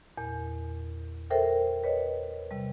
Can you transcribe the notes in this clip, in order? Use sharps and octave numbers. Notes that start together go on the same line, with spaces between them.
E2 A#2
A4 A#4 C5 E5 G5
B4 C#5 D#5
C3 G3